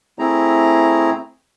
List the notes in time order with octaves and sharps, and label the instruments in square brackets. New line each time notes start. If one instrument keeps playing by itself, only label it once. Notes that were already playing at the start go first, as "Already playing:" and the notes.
[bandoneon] A3 C4 E4 G#4 A#5